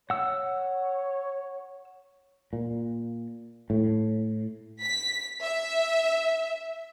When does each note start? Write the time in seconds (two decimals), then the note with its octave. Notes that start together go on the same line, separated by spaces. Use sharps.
0.10 C#5 F#5 E6
2.53 A#2
3.70 A2
4.81 B6
5.43 E5